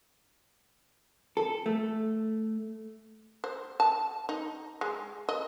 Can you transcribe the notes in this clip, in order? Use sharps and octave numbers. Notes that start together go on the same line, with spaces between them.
A4
A3
C5
A5
D#4
G#3
D#5